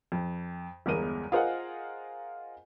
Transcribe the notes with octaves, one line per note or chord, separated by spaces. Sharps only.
F2
G1 E2 G#3 A#4 D#7
F4 G#4 A#4 C5 D#5 F#5